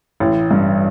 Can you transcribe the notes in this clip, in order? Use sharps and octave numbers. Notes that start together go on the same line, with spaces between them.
A1
G2